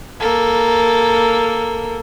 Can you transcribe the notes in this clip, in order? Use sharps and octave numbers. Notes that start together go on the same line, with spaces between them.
A#3 A4